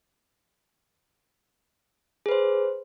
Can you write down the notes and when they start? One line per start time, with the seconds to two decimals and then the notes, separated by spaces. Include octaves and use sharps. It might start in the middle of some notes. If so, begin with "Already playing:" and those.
2.26 G#4
2.29 B4
2.31 C5